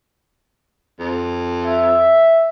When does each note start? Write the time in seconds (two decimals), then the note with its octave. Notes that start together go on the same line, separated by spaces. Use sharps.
0.99 F2
1.65 E5